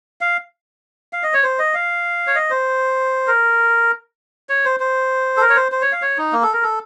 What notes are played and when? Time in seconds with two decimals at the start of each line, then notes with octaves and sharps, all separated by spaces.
0.21 F5
1.13 F5
1.23 D#5
1.34 C#5
1.43 C5
1.59 D#5
1.74 F5
2.27 C#5
2.35 D#5
2.50 C5
3.27 A#4
4.49 C#5
4.65 C5
4.80 C5
5.37 A4
5.41 A#4
5.50 C#5
5.56 C5
5.72 C5
5.82 C#5
5.92 F5
6.02 C#5
6.18 D#4
6.33 A#3
6.43 A4
6.53 A#4
6.63 A4